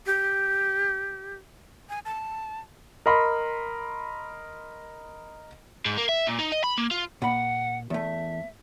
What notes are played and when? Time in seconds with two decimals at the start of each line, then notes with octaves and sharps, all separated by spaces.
0.06 G4
1.89 G#5
2.05 A5
3.06 A#4 D#5 B5 C6
5.86 G#2
5.98 A#3
6.09 E5
6.27 A#2
6.39 D#4
6.52 D#5
6.64 B5
6.78 A#3
6.91 F4
7.22 A#2 F#5 B5
7.90 E2 A3 E5